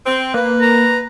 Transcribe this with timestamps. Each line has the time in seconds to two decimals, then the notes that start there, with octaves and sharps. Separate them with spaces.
0.04 C4
0.34 A#3 B4
0.61 A#5